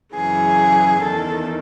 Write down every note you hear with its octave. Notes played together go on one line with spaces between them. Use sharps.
F#2 C#3 E3 G#4
E2 D#3 A4